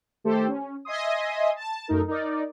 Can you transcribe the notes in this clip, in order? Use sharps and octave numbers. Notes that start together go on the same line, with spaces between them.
D#3 A3 G4 A4 C5
C#4
D#5 E5 G#5 C6 D#6
A5
F#2 A3 D#4 A#4
D#4 A#4 D5